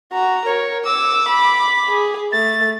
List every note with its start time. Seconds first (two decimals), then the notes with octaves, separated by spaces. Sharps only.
0.12 F#4 A#5
0.46 A#4 C#5
0.85 D6 E6
1.29 B5
1.89 G#4
2.32 A3 A6